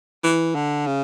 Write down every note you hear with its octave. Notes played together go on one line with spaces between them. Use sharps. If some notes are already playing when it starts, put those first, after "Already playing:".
E3
D3
C#3